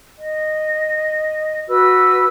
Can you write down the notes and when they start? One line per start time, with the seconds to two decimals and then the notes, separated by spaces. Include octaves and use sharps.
0.18 D#5
1.69 F#4 B4 E6